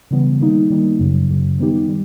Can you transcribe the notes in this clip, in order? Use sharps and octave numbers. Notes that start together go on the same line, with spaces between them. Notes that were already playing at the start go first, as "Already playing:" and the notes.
C#3 E3 G3 B3
D#3 G3 A#3 D#4
D#3 G3 A#3 D#4
F#2 C#3 F#3
F#2 C#3 F#3
D#3 G3 B3 D#4 G4
D#3 G3